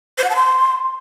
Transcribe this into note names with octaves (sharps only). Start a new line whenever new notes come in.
C5
F#5
A5
C6